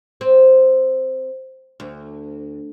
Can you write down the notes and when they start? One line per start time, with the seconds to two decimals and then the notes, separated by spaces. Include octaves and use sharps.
0.21 C4
1.80 D2